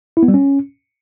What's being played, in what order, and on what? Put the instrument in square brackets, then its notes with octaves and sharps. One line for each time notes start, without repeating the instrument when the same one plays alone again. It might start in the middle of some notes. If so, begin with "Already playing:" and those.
[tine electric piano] E4
B3
G3
C#4